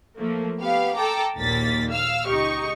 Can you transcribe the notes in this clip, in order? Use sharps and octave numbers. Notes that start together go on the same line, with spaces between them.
F3 A3 A#3
B3 G4 F5
A4 G5 A#5 D6
A#1 D#2 A#2 A#3 A6 B6
F5 E6 F6
C#2 D#4 G4 C#6